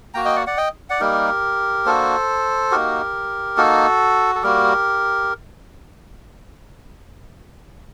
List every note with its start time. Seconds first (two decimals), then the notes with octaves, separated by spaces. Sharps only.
0.14 A#3 F#4 G5 A#5
0.25 D#5 G5
0.36 D5 F#5
0.47 D5 F#5
0.57 D#5 G5
0.89 D5 F#5
1.00 G3 A#3 D#4 G4 A#4
1.85 A#3 D4 F#4 A4 C5
2.71 A#3 D#4 F#4 G4 A#4
3.57 A#3 D#4 F#4 A4
4.35 A4
4.42 G3 A#3 F#4 G4 A#4